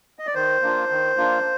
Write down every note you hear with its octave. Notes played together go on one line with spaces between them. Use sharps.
D#5
D5
D#3 C5
A#3 D4 F4
D#3
A#3 D4 F4